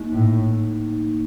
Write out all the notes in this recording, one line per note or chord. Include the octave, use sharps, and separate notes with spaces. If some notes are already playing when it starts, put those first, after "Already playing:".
Already playing: A#3 D#4
A2